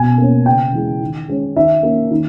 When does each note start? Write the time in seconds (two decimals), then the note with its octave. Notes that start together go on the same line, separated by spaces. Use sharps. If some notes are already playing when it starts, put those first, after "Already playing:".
Already playing: B2 G#5
0.18 A#3 C#4
0.46 C#3 G5
0.73 E3 G#3
1.01 D#3
1.28 G#3 C#4
1.56 D#3 E5
1.83 A#3 C#4
2.11 D#3